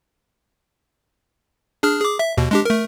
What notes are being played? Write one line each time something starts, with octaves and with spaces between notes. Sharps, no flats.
D4 G#4 F6
G#4 D6
E5
D#2 B2
G#3 D4 G4
A3 A#4